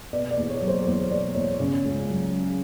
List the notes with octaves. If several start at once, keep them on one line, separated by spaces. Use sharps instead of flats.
B2 D5
D5
E2
C#5
F#3
C5
E2 C5
B2 D5
E2 C#5
C#3
C#2
F#3